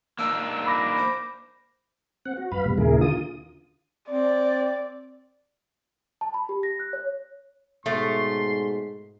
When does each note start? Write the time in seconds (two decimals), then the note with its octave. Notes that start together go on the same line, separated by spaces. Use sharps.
0.19 A#3 D4 D#4 E6
0.67 B5 D6 A#6
0.98 C5
2.26 C4 F#5
2.37 F#4
2.52 F#2 B4 F5 B5
2.65 G2 B2 G3
2.78 D#2 A#2 C#3 E4 G#4 A#4
3.01 D3 F4 D#6
4.11 C4 D5
6.21 A5
6.34 B5
6.49 G4
6.63 A#6
6.80 F#6
6.93 C#5
7.86 G#2 B2 A3 C#5 C6